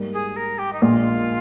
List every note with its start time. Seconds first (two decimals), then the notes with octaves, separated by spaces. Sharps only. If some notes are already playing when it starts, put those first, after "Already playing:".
Already playing: G#2 G3 A#3
0.13 G#4
0.36 A#4
0.58 G4
0.73 D#4
0.81 A#1 A#2 G#3 F4